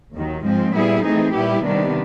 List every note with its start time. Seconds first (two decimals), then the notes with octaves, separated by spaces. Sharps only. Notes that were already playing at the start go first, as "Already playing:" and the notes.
0.14 D#2 D#3 F#3
0.44 G#2 F3 G#3 C4
0.74 A#2 G3 B3 E4 G#4
1.04 E3 A3 C4 D#4 G#4
1.34 A#2 G3 B3 E4 G4
1.64 C3 D#3 G3 B3 D4